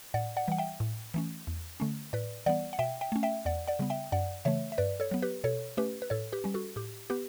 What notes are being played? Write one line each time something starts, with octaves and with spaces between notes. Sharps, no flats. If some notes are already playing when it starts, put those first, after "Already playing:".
A2 D5 F#5
D5 F#5
E3 G3 F#5
E5 G5
A2
E3 A3 C#4
E2
D3 A3 C#4
A2 B4 D5
E3 G3 B3 D5 F#5
F#5
B2 E5 G5
E5 G5
A3 C#4
E5 G5
E2 D5 F#5
D5 F#5
C#3 G3 B3
E5 G5
F#2 D5 F#5
C#3 E3 A3 C#5 E5
E5
G2 B4 D5
A4 C#5
F#3 B3
G4 B4
B2 A4 C#5
A3 C#4 G4 B4
B4
A2 A4 C#5
G4 B4
G3 C#4
F#4 A4
A2 G4
B3 G4 B4